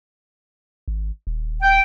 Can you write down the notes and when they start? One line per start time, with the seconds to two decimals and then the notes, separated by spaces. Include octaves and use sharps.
0.88 G#1
1.27 D#1
1.62 G5